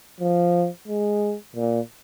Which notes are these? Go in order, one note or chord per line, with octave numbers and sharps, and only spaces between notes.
F3
G#3
A#2